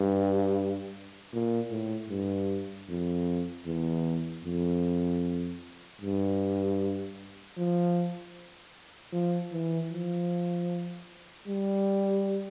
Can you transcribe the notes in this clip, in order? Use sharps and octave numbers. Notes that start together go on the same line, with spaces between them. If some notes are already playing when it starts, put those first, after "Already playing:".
Already playing: G2
A#2
A2
G2
F2
E2
F2
G2
F3
F3
E3
F3
G3